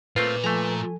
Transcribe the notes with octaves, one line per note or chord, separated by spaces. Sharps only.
A#2 A3 C4 F4 B4
F3 A3 A4 G#5 A#5